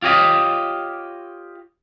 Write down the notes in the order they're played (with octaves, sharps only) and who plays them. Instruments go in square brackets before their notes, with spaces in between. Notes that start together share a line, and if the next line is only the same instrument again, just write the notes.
[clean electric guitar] F4 G4 C#5 D#5